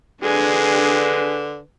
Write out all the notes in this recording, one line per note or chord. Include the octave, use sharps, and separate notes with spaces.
D3 G#3 D4 G#4 B4